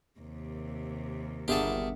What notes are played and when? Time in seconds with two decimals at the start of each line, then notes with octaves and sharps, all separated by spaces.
0.20 D#2 C3
1.48 G1 G4 G#4 A#4 E5 F#5 A5